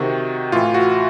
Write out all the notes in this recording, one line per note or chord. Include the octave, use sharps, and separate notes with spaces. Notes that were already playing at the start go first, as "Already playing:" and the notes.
Already playing: C3 D#3 F#4
A2 E3 F4
F#4